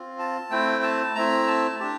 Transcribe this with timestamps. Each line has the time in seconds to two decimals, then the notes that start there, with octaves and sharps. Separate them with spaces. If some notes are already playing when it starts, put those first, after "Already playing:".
Already playing: C4 F4
0.19 A5
0.50 A3 C4 E4 G5
0.83 A5
1.15 A3 C4 E4 A#5
1.47 A5
1.80 D4 G4 A5